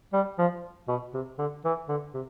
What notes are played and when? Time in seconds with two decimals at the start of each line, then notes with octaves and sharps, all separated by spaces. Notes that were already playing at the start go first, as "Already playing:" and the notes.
0.13 G3
0.38 F3
0.88 B2
1.14 C3
1.38 D3
1.65 E3
1.88 D3
2.14 C3